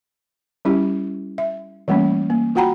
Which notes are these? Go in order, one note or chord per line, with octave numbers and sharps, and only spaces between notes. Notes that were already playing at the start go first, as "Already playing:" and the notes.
G3 C#4 E4 G4
E5
E3 G3 A3 A#3 C#4
A#3
F4 F#4 F#5 G5 A#5 B5